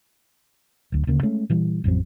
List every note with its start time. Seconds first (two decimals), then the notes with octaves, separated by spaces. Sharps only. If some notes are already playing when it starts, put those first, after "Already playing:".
0.92 D1 D2
1.07 D2 C#3 A#3
1.23 G#3 A3 C#4
1.50 A#2 E3 G3
1.84 A1 F2 F#3 C4